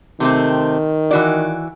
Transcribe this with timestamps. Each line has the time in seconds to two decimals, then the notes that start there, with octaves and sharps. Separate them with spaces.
0.20 C3 D#3 A3 C4
1.11 E3 F#4 D5